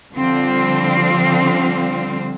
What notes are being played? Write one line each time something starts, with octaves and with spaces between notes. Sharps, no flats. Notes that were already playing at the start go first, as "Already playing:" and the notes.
D3 F3 G3 C4 F4